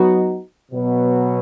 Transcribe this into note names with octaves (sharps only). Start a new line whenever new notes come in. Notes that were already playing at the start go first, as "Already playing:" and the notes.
Already playing: F#3 B3 D#4 F#4
B2 F#3 B3